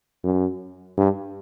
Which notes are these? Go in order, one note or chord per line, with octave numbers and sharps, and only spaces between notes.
F#2
G2